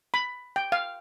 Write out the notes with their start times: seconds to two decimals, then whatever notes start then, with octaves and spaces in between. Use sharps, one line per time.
0.14 B5
0.56 G5
0.72 F5